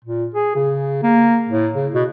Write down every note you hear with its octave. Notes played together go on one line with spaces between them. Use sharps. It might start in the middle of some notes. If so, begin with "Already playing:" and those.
A#2
G#4
C#3
A#3
A2
C#3
B2